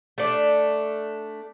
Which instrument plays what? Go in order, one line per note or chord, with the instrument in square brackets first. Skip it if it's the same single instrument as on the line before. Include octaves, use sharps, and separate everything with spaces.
[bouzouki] A3 D4